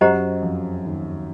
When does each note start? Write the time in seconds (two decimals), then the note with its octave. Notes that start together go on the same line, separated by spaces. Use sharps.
0.01 F#2 F#3 G4 C5 D#5 F#5 A#5
0.42 F2 F3
0.85 D#2 D#3